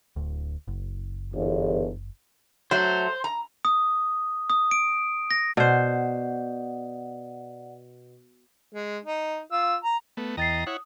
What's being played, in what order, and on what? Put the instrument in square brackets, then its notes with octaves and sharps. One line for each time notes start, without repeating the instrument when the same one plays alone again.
[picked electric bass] D1 D2
F#1
[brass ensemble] G1 E2
[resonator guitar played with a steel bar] F#3 A3 [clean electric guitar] C5
[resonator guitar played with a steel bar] A#5
[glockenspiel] D#6
D#6
D7
A#6
[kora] B2 C5 [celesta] D5 F#5
[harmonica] G#3
D#4
F4 E6
A#5
[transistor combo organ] A3 B3
[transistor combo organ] E2 D#5 A#5 [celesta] G5 A6 C7
[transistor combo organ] E4 C#5 F#5 [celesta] D#6